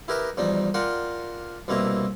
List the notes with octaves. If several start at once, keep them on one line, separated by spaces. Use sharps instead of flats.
E4 G4 A#4 B4 D#5 E5
E2 F3 G3 D#4 D5
F4 A#4 D5 F#5 G5
C2 B2 A#3 C4 E4 A#5